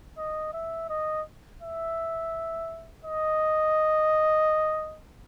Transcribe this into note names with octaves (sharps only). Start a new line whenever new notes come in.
D#5
E5
D#5
E5
D#5